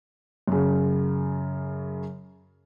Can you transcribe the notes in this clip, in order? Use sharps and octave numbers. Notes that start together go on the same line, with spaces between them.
F#2 C#3